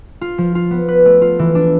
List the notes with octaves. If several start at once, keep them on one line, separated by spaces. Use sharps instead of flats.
F4
F3
F4
B3
B4
A3
F4
E3
D4